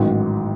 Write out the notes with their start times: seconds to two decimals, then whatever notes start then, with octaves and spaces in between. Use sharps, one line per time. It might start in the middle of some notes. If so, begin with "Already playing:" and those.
Already playing: A1 G#2 D#3 F#3